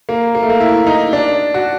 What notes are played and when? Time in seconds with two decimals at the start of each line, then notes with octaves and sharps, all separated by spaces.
0.09 A#3
0.35 A#3
0.43 A3
0.50 A#3
0.60 E4
0.87 D#4
1.13 D4
1.54 F#4